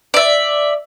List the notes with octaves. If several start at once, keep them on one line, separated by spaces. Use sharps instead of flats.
D5 E5